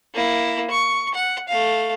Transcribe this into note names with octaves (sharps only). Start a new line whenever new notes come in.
A#3 E4
C#6
F#5
A3 F5